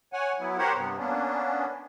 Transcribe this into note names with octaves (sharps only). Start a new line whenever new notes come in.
C#5 F#5 G#5
F#3 B3 E4
G4 A#4 C5 C#5 F#5
G2 C3 B3
A#3 B3 C#4 D4